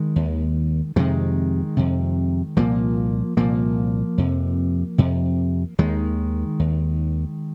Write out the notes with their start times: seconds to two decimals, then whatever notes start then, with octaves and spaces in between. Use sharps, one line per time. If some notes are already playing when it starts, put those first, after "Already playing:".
Already playing: D#3 G#3
0.16 D#2
0.96 F2 C3 D#3 G#3
1.77 F2 C3
2.57 C2 A#2 F3 A#3
3.37 C2 A#2 F3 A#3
4.18 F2 C3
4.98 F2 C3
5.78 D#2 D#3 G#3
6.59 D#2